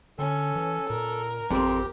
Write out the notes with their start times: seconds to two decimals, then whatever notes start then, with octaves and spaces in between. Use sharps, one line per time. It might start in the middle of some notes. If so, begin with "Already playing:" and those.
0.19 D3 C#4 A4
0.56 E3
0.90 A#2 A#4
1.51 G#1 F2 C4 G4